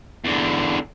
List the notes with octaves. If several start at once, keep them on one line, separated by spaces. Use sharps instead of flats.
E2 D3